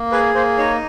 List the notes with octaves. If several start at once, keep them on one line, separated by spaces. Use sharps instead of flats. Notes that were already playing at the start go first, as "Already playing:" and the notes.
Already playing: A#3
G#4 B4
A#3 C5
D#4 C#5